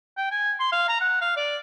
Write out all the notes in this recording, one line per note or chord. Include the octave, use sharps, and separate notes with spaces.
G5
G#5
C6
F5
A#5
F#5
F5
D5